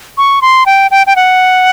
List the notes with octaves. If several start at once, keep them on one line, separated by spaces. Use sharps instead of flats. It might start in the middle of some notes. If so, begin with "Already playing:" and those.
C#6
C6
G5
G5
G5
F#5